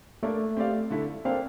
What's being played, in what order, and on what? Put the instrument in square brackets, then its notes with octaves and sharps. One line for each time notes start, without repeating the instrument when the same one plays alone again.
[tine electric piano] A3 [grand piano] A#3 D4 A4
[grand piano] C4 G4 D5 F5
D3 A3 E4
[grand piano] A#3 D4 A4 C5 F5 [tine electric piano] C4